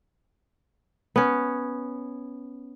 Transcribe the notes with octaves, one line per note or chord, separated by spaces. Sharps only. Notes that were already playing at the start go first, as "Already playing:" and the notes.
B3 C#4